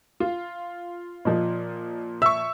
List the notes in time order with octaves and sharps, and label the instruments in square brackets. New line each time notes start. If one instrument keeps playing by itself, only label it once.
[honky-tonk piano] F4
[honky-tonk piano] A#2 F3 [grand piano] D#5
[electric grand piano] E5 C#6 [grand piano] E6